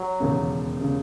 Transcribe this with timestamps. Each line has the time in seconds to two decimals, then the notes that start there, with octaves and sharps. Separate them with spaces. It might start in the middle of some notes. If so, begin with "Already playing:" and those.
Already playing: F#3
0.20 E1 D#2 C#3
0.81 C#3